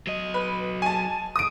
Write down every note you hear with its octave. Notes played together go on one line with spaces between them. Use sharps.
F#3 D#5
B4
G#5 A5
D#6 D7